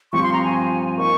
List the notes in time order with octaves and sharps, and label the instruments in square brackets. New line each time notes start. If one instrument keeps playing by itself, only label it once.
[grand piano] G2 F3 C4 G4 C5 [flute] C#6
[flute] C6
A#5
G#5
[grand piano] A#3 D#4 A#4 F5 [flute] C#6